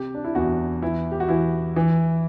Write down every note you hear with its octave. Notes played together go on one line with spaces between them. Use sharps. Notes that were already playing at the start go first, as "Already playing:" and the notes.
Already playing: C3 G4
D4
E4
E2 F#4
E3 E4
G4
F#4
E3 E4
E3